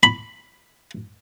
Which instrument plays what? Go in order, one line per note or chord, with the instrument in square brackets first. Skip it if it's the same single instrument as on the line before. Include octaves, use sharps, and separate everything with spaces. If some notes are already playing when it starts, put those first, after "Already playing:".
[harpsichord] B5